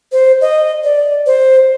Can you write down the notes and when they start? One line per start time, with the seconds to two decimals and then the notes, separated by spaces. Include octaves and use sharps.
0.12 C5
0.41 D#5
0.84 D5
1.26 C5